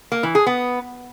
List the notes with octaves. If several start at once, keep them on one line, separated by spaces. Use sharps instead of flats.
A#3
E3
G#4
B3